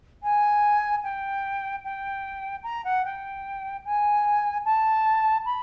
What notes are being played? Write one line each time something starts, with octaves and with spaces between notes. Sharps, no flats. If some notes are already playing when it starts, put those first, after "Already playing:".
G#5
G5
G5
A#5
F#5
G5
G#5
A5
B5